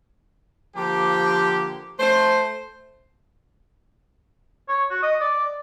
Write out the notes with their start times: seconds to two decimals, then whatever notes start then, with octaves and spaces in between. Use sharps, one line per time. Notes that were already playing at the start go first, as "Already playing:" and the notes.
0.76 D3 F3 A#3 G4
2.00 A3 C5
4.69 C#5
4.90 F#4
5.03 D#5
5.21 D5